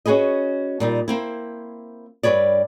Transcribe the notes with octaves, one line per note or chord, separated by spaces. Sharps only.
C#4 F#4 G#4 B4 D#5
A#2 G3 D#4
A#3 C4 E4
G2 G3 B4 C#5 D5